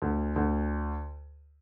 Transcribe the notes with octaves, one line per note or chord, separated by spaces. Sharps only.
D2
D2